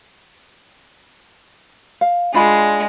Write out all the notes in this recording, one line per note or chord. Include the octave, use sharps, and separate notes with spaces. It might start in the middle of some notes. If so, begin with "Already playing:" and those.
F5
G#3 D4 F4 B5